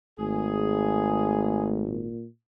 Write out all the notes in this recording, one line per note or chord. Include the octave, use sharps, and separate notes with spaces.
G#1 A3 G#4
A#2